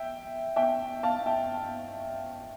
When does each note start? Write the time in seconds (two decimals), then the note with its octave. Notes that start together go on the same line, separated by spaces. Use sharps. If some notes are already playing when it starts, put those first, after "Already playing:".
Already playing: E5 G5
0.56 E5 G5
1.03 F5 A5
1.26 E5 G5